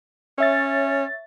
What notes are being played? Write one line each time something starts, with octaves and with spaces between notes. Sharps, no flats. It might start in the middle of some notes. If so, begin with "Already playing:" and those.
C#4 C#5 E5 A6